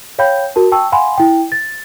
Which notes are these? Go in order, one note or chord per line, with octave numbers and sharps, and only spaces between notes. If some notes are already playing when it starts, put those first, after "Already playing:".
C#5 F5 G5 B5 G6
F#4 A#4 A5
G5 A5 C#6 E6
F5 F#5 G#5 B5 C6
E4 G5
A6